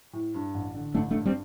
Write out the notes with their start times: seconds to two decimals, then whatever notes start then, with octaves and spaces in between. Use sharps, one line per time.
0.13 A2
0.34 G2
0.54 A1
0.75 D3
0.95 A1 A3 D4
1.11 A3 D4
1.15 G2
1.25 G3 C4